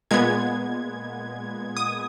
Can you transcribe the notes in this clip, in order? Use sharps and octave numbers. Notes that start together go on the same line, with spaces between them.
A#2 G#3 B3 G#6
D#6